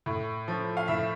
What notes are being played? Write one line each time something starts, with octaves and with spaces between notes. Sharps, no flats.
A2
F3
F5
A2 E5